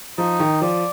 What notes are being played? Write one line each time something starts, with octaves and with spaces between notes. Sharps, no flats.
F3 D#4
D#3
F3 D5